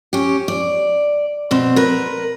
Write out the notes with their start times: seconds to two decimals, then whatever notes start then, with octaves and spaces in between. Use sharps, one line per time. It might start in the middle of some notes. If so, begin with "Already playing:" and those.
0.13 C#4 G4
0.48 D5
1.51 B2 C4
1.76 A#4 B4